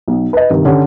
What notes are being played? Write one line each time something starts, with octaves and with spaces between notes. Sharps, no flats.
B1
B4 D#5
G2 C3 D#3
D3 C#4 G4